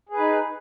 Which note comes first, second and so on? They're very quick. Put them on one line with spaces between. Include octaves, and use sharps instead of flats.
G#4 B4 D#4